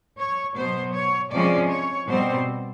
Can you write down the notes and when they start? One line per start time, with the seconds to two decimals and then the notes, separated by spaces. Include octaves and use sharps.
0.17 C#5
0.55 B2 F#3 B3 C5
0.93 C#5
1.31 C3 F3 G#3 C#4 D5
1.69 C#5
2.07 B2 G3 C4 C5